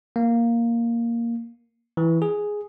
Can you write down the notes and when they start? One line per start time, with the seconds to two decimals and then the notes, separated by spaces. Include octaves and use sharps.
0.16 A#3
1.97 E3
2.22 G#4